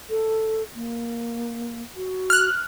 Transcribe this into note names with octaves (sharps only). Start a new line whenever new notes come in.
A4
A#3
F#4
F6 F#6